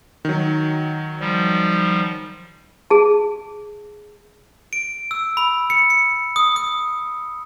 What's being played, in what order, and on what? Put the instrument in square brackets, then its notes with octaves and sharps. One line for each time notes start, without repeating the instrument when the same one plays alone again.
[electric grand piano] D#3 F#3
[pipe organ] F3 G3
[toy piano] G#4 A5
[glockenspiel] D7
E6
B5
C#7
C#7
D#6
D#6